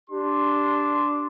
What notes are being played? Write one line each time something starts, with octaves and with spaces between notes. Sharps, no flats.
D4 G4 C6